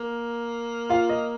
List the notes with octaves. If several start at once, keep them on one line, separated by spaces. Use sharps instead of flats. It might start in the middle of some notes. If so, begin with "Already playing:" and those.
Already playing: A#3
F4 F5
D#5